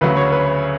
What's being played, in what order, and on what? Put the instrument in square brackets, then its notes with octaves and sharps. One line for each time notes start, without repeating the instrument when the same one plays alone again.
[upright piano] D2 C#3 F#3 B4
C#5
B4